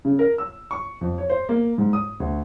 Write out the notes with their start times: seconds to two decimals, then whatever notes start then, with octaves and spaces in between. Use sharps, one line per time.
0.05 C#3
0.19 A#4
0.38 E6
0.71 C#6
1.01 F2
1.18 C#5
1.30 C5
1.49 A#3
1.78 G#2
1.93 D#6
2.20 D2